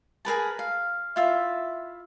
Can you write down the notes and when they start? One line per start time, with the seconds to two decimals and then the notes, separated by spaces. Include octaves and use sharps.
0.25 G#4 A#4 B4 A5
0.59 F5
1.16 E4 F4 E5